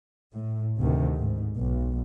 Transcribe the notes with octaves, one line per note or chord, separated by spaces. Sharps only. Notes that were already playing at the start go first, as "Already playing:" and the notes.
A2
D2 C3 D#3
G#2
B1